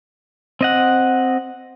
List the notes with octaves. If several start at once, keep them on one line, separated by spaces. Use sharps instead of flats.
C4 D#5 F#5